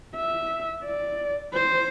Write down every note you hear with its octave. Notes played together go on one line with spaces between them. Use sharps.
E5
D5
C5